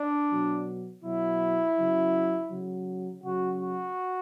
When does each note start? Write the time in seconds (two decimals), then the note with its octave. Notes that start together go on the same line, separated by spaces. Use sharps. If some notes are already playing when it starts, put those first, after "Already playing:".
Already playing: D4
0.29 B2 F#3
1.03 B2 F#3 E4
1.76 C#3 F#3
2.51 C#3 F#3
3.24 C#3 F#3 F#4
3.61 F#4